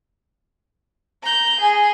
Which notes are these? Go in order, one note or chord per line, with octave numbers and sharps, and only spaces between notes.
A#5 G6
G#4 G#5